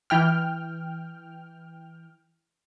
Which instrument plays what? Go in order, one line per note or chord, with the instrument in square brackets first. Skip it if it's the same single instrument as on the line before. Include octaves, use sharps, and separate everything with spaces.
[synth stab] E3 G5 F6